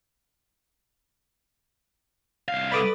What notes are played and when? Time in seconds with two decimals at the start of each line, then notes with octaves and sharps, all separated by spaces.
2.48 C2 F5
2.72 A3 B4 D5 B5 D6 D#6